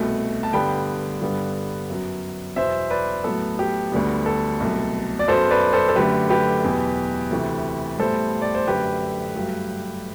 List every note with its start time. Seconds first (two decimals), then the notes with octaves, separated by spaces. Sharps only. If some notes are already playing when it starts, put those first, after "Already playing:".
Already playing: C2 B2 A3
0.43 A5
0.53 G2 D3 G3 B3 G5 B5
1.21 G2 D3 G3 B3
1.90 F#2 F#3 B3
2.56 E2 B2 F#3 C5 E5
2.90 B4 D5
3.24 A2 F#3 B3 A4
3.59 G4
3.92 D2 D3 G3 B3
4.26 A4
4.60 C2 B2 F#3 A3
5.19 D5
5.28 F#2 F#3 B3 A4 C5
5.50 B4 D5
5.73 A4 C5
5.89 A4
5.95 F#2 D3 A3 G4 B4
6.30 G4 B4
6.64 E2 B2 F#3
7.31 D2 C3 E3 A3
7.99 A2 G3 B3 A4 C5
8.42 D5
8.55 C5
8.67 F#2 D3 A3 G4 B4
9.36 G2 F#3 A3